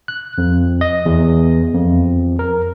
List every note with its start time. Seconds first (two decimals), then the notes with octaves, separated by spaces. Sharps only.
0.08 F#6
0.38 F2
0.81 D#5
1.06 E2
1.75 F2
2.39 A#4